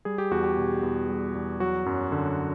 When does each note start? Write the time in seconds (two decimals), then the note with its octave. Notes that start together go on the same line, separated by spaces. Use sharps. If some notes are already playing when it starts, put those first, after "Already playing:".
0.05 G3 G#4
0.18 G4
0.31 E2 F#4
0.44 G4
0.57 B2
0.83 E2
1.09 G3
1.35 E2
1.60 F#3 F#4
1.86 F#2
2.12 D3